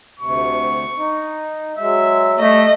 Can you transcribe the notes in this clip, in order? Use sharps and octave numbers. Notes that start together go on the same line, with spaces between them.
D2 C3 C#6
D#4
F#3 G#3 E5
G3 A3 D#5